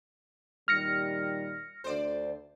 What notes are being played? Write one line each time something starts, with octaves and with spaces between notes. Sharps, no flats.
A#2 D#3 G3 F6 A#6 C#7
D2 D3 C5 D5